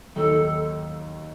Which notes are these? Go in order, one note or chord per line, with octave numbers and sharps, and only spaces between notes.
D#2 D#3 F#3 A#3 D#4 A4